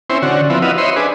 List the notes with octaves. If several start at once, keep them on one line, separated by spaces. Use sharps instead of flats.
C4 C#4 E4 C5
D3 C#4 F#4
F3 B3 C4 E4
E4 F#4 B4 D#5 F5
C5 C#5 D#5 E5 B5 C6
D4 G#4 B4